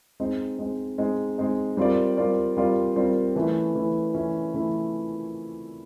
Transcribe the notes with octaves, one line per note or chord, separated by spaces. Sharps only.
G#3 C4 D#4
G#3 C4 D#4
G#3 C4 D#4
G#3 C4 D#4
G3 C4 F4 A#4 D5
G3 C4 F4 A#4 D5
G3 C4 F4 A#4 D5
G3 C4 F4 A#4 D5
E3 A3 C#4 E4
E3 A3 C#4 E4
E3 A3 C#4 E4
E3 A3 C#4 E4